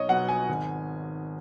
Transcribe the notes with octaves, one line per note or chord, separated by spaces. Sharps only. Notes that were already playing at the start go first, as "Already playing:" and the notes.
Already playing: B1 C#5 D#5
B2 F#3 F#5
G#5
G#1